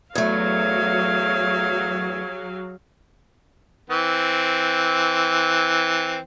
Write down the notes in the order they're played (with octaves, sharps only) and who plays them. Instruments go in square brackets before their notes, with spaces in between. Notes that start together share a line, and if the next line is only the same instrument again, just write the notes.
[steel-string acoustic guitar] E2 A3 [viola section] F#3 [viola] G#4 F5 [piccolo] G#6
[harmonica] E3 C4